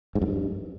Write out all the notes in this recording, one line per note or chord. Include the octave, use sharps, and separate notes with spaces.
G#2
F#2
G2